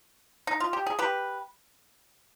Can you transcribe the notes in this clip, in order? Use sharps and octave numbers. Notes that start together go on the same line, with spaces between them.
D#4
F4
G4
G#4
G4 B4